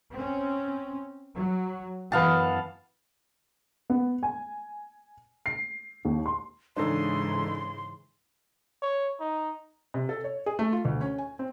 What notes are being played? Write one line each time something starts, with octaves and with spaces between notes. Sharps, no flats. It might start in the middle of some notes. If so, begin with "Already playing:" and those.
C4 C#4
F#3
F#2 E3 B3 F5 A5
B3
G#5
C7
D#2
C6
G#2 C#3 E3 D4 D#4 A4 C6
C#5
D#4
C3
A4
C#5
G#4
A3
F4
D2
C#4
G#5
C4